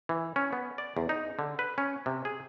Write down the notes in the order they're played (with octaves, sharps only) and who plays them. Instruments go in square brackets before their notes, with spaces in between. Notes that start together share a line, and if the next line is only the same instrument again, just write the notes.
[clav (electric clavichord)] E3
C#4
B3
D5
E2
D#4
D3
B4
C#4
C3
G#4